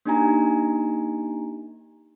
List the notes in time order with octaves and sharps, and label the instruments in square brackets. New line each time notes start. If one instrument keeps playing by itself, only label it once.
[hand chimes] A#3 D4 D#4 G4 G#5 A#5